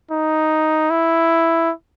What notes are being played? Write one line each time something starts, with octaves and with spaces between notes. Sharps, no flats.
D#4
E4